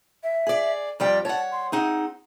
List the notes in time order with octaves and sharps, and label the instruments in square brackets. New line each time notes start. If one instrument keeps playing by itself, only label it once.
[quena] E5
[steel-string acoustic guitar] G#4 D5
[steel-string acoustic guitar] F2 G3 G5 [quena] D5
[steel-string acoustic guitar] C#5 F#5 [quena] A5
[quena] C6
[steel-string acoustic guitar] C4 D#4 F#5 [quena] G#4